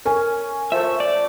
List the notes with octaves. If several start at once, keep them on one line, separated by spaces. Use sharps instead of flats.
C#4 A#4 G#5
F3 A3 E5
D5